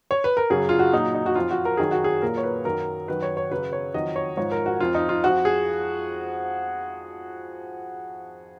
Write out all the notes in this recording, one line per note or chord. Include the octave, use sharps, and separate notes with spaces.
C#5
B4
A#4
F#2 C#3 F#3 G#4
F4
F#4
A#2 F#3 D#4
D#4
F#4
F2 F3 F4
F#4
A#4
F#2 D#3 F#3 G#4
F#4
G#4
A#2 F#3 A#4
C#5
B4
F#2 D#3 F#3 A#4
F#2 D#3 F#3 B4
C#5
C#5
F#2 C#3 F#3 B4
C#5
F2 D#3 F#3 D#5
C#5
G#2 F3 C#5
A#4
F#4
F2 F3 F4
D#4
F4
F2 F3 F#4
G#4